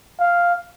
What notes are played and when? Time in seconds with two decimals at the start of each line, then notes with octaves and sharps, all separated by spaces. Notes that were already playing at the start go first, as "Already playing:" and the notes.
0.20 F5